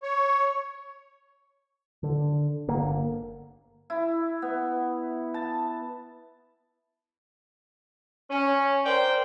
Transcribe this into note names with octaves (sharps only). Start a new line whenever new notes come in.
C#5
D3
G1 D3 A#3
E4
B3
A5
C#4
A#4 C5 D5 G5